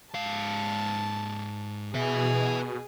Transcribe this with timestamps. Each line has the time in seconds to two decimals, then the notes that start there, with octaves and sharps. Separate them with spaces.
0.15 G#2 F5 A5
1.94 B2 G#4 B4 E5